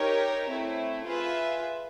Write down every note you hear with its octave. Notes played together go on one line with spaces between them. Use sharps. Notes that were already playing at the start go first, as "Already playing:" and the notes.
Already playing: D#4 G4 A#4 C#5
A3 C4 E4
F4 G#4 B4 E5